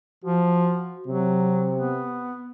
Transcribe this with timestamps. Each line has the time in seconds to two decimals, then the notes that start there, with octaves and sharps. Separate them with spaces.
0.24 F3 F#4
1.07 C3 F#3
1.77 B3